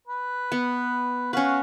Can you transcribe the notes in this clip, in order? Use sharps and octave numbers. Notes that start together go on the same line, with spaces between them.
B4
B3
C#4 F#4 B4 F5